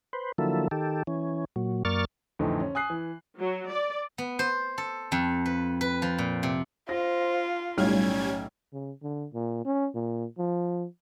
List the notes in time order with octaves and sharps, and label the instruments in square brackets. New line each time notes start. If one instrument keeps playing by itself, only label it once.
[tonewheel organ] B4 C5
D3 F3 F#3 A#3 E4 A4
D#3 G4 A4
E3 C#4
A#2 F#3
F#2 A#3 D5 C#6 F6 A6
[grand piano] F2 A2 D3 E3 D#4
C#4
G#5 D#6 F#6 C7
E3
[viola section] F#3
D5
[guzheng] B3
C5
A4
F2
B4
B4
F3
A#2
C3
[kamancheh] F4 [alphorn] C5 [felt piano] A#6
[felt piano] B1 A2 F6 [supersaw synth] G3 G#6 [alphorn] C#4
[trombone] C#3
D3
A#2
C#4
A#2
F3